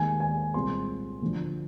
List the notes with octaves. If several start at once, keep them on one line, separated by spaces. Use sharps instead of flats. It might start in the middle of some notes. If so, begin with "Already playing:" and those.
Already playing: D#2 D#3 G#3 G#5
G#5
C2 A#2 G#3 C4 C6
D2 D3 F3